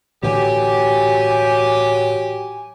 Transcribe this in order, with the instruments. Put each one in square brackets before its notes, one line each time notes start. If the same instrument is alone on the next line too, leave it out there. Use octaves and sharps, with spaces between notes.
[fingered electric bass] A2 D3 E3 [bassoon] F#3 [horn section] G4 [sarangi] G#5